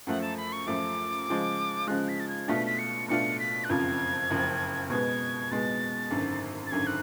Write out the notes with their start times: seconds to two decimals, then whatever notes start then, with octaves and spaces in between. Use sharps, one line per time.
0.07 F#2 F3 A3 F#5
0.22 A5
0.37 B5
0.53 C#6
0.67 F#2 F3 A3 D6
1.28 C#3 F3 G#3
1.88 C#3 F3 G#3 F#6
2.09 B6
2.20 A6
2.28 G#6
2.48 B2 A3 D4 F4 B6
2.66 B6
2.79 C#7
3.08 B2 A3 D4 F4 C#7
3.40 B6
3.64 F#6
3.69 F#1 F2 C#3 F3 G#6
4.30 F#1 F2 C#3 F3
4.90 B2 G#3 B3 G#6
5.51 B2 G#3 B3 A6
6.11 G#1 F#2 D3
6.67 A6
6.71 G#1 F#2 D3 G#6
6.87 F#6